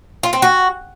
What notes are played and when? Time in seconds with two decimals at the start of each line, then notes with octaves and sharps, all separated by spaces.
0.23 F4
0.33 C4
0.42 F#4